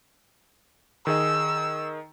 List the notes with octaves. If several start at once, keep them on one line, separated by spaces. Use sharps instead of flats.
D#3 G#4 D#5 E6